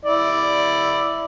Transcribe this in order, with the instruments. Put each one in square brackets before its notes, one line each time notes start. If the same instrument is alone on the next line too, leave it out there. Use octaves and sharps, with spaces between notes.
[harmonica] E4 D5